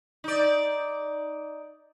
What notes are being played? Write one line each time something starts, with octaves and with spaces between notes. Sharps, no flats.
D#4 D5